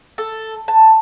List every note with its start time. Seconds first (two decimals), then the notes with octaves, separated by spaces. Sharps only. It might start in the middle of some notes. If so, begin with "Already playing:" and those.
0.18 A4
0.68 A5